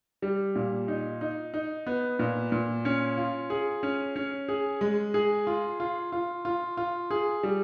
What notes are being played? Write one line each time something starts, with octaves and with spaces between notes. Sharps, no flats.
G3
A#2
D#4
D#4
D#4
B3
A#2
A#2
C#4
F4
G#4
C#4
C#4
G#4
G#3
G#4
F4
F4
F4
F4
F4
G#4
G3